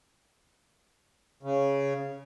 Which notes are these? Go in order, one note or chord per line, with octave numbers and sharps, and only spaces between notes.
C#3